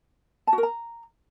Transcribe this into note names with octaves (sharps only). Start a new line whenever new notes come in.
A5
F#4
A#4
A#5